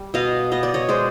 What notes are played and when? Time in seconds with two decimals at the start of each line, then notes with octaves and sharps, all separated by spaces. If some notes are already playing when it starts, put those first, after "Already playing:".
Already playing: G3
0.14 B2 D#5 F5
0.52 B3 D#5
0.63 D5
0.74 C#5 D#5
0.89 G#3 C5 D5